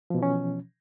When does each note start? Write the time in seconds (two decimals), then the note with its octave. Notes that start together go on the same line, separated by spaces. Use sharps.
0.10 F3
0.14 B2
0.18 E3
0.23 C#4